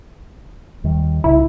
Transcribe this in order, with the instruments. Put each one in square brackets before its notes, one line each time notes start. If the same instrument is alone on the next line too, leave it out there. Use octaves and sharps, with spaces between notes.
[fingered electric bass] D#2 D#3 G3
[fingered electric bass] C2 A2 C#3 [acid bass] E4